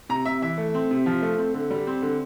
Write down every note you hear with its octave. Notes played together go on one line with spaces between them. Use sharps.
C3 A#5
C3 E5
E3 E5
A3
C4
C3
F3
A3
C4
D3
G3
C4
D3